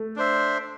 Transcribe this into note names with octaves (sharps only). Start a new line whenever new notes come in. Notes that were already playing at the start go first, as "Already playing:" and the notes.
Already playing: A3
D4 C5 E5